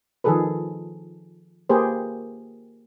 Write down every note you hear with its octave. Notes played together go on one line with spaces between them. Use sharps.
D#3 F3 G#4 A4 B4
A#3 G4 G#4 B4 C5